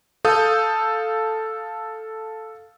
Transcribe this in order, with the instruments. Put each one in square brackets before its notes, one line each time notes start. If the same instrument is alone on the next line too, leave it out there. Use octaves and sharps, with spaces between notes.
[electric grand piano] A4 F5 D#6 G6